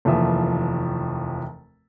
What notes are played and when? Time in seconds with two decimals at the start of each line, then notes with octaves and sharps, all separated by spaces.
0.05 F1 D#2 E3 F3 E5